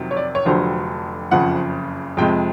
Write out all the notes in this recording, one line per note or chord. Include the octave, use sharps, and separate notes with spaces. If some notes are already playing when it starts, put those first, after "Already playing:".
Already playing: F2 C3 D#3 F#3
C#5
D5
C#5
F1 F2 D3 F#3 C5
F#1 F2 C#3 F3 F#5
F2 C3 F3 G#3 G5